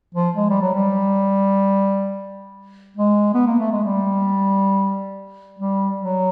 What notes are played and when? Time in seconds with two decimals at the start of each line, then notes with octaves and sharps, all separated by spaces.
0.15 F3
0.36 G#3
0.50 G3
0.61 F#3
0.75 G3
2.97 G#3
3.34 B3
3.47 A#3
3.60 A3
3.72 G#3
3.84 G3
5.59 G3
6.02 F#3